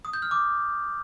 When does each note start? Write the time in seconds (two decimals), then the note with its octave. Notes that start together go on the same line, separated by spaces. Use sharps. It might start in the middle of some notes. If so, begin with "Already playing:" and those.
0.05 D#6
0.13 G6
0.22 F6
0.31 D6